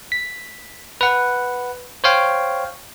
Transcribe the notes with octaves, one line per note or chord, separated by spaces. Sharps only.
B6
B4 F#5
C5 C#5 F5 G5